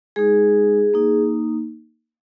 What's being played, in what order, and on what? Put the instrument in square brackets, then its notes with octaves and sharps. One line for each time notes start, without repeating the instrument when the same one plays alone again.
[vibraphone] G#3 D#4 G#4
A#3 D#4